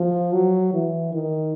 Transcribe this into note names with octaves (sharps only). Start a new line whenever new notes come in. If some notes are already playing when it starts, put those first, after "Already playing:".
Already playing: F3
F#3
E3
D#3